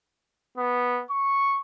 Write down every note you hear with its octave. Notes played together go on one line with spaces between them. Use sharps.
B3
C#6